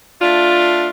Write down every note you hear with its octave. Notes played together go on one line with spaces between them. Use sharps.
A3 D4 F4